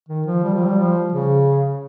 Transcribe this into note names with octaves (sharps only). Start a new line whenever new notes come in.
D#3
F3
G3
F3
G3
F3
C#3